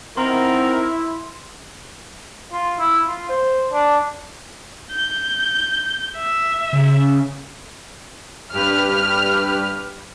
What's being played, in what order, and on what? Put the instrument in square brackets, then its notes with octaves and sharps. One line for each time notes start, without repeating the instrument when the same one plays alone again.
[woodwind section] D#3 B3 A#4 [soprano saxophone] C4 [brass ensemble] E4 [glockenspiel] C6
[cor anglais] F4
E4
F4
C5
D4
[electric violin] G6
E5
[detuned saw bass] C#3
[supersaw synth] G2 G4 B4 [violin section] F6